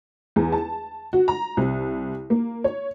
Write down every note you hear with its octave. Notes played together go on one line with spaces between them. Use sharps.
E2
A5
F#4
A#5
C2
A#3
C#5